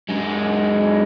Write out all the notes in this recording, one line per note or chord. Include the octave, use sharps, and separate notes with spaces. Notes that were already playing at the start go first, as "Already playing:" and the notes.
F#2 G#3